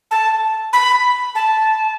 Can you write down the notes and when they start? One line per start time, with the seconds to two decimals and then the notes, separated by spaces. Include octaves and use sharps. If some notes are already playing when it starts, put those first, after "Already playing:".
0.11 A5
0.73 B5
1.35 A5